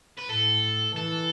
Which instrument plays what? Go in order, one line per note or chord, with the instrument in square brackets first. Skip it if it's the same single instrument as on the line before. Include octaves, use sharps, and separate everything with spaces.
[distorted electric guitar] B4
[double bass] A2 [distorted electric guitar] A4
[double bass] E3 [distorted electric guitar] A4